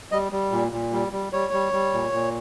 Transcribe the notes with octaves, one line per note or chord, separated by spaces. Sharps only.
G3 D#5
G3
A#2
A#2
G3
G3
G3 C#5
G3
G3
A#2
A#2